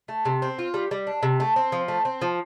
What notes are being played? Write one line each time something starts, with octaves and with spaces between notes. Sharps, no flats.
A3
C3
C4
F4
G3
G3
D4
C3
A3
C4
F3
A3
C4
F3